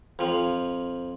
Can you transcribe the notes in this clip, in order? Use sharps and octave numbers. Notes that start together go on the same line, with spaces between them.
F2 F3